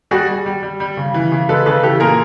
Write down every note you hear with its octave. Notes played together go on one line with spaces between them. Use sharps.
G3 F#4 G#4
G3
G3
G3
G3
C#3
E3
C#3
G#3 A4 B4
C#3 A4 B4
E3 G4 A4
A#2 G#4 A#4